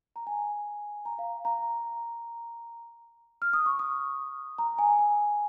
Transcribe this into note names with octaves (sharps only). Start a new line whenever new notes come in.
A#5
G#5
A#5
F5
A#5
F6
D#6
C#6
D#6
A#5
G#5
G#5